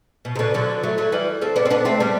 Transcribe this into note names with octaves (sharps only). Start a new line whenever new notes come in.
B2
C3
B2 D3
D3 F#3
F#3 A3
F#3 A3
E3 G3
A3 C4
B3 D4
C4
B3 D4
A3 C4
G3 B3